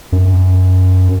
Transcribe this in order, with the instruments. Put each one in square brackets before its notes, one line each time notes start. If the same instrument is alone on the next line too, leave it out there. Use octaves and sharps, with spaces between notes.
[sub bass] F#2